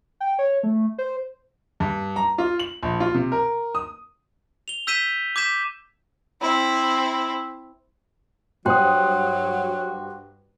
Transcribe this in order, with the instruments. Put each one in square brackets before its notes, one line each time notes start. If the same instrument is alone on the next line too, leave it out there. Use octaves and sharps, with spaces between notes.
[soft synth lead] G5
C#5
A3
C5
[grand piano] G2
A#5
F4
F#7
A#1
F4
C3
A#4
D#6
[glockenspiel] F7 G7
E6 G6 B6 D#7 E7 G7
D6 G6 G#6 B6 E7
[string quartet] C4 E4
[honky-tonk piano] G2 C5 D#6 [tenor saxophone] F#3 [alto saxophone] F#4 [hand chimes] G5 C6 F#6